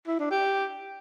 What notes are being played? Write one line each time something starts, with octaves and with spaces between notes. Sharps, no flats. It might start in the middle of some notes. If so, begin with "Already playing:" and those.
E4
D4
G4